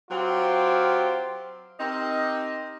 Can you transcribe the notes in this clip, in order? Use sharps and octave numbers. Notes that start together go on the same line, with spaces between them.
F#3 C4 F4 G4
C4 D#4 G4 A#4